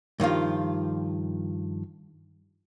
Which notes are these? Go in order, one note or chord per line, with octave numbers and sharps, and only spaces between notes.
G2 D#3 F3 F4